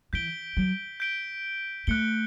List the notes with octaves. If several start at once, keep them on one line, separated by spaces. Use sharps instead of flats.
E3 G6 B6 D7 G7
F#3
G6 B6 D7 G7
A3 F#6 C#7 G7